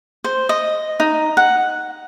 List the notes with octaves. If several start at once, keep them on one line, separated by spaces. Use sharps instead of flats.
C5
D#5
D#4
F#5